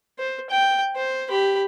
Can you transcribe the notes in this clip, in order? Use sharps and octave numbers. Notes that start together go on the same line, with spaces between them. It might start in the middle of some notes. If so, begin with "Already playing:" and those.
C5
G5
C5
G4 B5